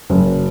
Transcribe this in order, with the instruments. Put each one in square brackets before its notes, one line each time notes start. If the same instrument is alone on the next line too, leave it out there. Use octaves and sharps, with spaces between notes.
[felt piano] F#1